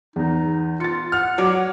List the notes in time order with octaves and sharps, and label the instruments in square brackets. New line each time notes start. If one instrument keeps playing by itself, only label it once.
[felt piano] E2 [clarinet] D#4
[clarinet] F4 [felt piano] A6 C#7
[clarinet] F#5 [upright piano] F6
[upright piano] F#3 [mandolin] C#5 D5